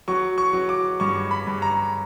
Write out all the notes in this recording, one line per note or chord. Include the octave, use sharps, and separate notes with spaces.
F#3 C#6
C#6
F#3
D6
G2 C#6
B5
G2
A#5